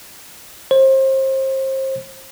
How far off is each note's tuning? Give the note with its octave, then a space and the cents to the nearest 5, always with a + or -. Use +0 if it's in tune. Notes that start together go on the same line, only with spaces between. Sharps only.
C5 +30